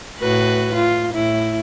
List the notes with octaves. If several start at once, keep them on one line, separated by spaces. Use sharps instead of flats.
A2 F#4 B4
F4
A2 E4